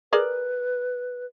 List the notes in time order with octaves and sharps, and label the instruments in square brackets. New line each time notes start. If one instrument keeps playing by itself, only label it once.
[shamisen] G#4 A#4 D5 [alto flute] B4